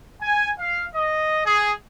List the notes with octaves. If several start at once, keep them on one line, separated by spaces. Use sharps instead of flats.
G#5
F5
D#5
G#4